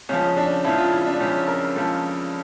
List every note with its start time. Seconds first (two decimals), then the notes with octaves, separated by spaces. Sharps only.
0.09 C#2 C#3 F3 C#4
0.37 D4
0.64 C#2 C#3 F3 E4
0.78 F4
0.92 E4
1.06 D4
1.19 C#2 C#3 F3 C#4
1.47 A#4
1.75 C#2 C#3 F3 A4